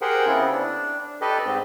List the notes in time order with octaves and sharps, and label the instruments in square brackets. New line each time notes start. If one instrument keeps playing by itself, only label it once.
[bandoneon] G4 G#4 A#4 C5 F#5 G5
C#3 B3 C4 E4
D4
G4 A4 B4 D5 D#5
G#2 C4